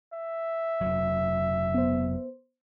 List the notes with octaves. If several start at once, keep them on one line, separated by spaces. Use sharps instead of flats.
E5
F1 C#2 F#3
B3 C5